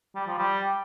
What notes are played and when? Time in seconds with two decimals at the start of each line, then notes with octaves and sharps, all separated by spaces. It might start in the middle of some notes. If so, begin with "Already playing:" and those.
0.15 G3
0.27 F3
0.38 G3